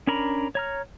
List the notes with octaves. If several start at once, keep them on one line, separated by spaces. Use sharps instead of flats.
C#4 D4 A#4 A#5 B5
C#5 A#5 F6